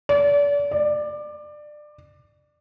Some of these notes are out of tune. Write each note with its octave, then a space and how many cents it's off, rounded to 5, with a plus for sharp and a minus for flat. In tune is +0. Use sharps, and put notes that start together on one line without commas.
D5 -35
D5 +20